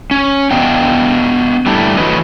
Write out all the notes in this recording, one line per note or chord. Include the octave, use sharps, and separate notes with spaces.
C#4
B3 D4 D#5 F5 G5
G3 A3 D4 E4
E3 A3 F#4 B4 C#5 D#5